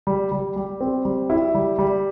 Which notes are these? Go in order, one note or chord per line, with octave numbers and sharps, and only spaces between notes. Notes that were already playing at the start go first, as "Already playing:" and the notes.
G3
G3
G3
C4
G3
E4
G3
G3